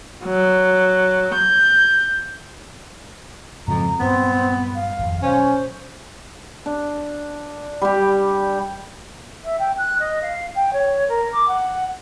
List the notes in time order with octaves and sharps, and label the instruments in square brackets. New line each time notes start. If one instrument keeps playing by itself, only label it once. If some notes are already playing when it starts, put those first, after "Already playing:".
[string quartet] F#3
G6
[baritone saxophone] F2 [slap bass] G#2 C#3 F#3 [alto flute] A#5
[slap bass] G2 A#2 F#3 [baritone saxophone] B3 [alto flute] C4
[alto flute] F5
[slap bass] G#1 F2
[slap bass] B2 F#3 [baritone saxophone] C#4 [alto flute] C5
[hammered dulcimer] D4
G3 G4
[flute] E5
G5
F#6
D#5
F5
G5
C#5
A#4
D6
F#5